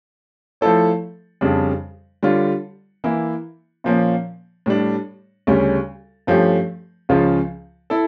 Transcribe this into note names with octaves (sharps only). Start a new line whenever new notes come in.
F3 A3 E4 A4 C#5
F2 C#3 G3 D4
D3 G3 D4 F4 C#5
E3 A#3 E4
A#2 F3 A#3 C#4
A2 G3 D4
D2 C#3 G3 C#4
G2 F3 A3 C#4 G4
C#2 C#3 F3 C#4 F4
E4 A4